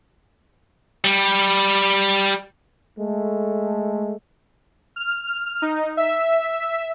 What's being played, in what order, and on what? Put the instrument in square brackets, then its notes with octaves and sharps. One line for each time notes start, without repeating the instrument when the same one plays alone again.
[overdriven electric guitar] G3
[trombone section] G#3 A3
[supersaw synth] F6
D#4
E5